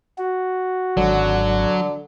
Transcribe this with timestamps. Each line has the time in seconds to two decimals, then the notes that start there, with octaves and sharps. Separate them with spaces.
0.18 F#4
0.97 G#1 D3 F#3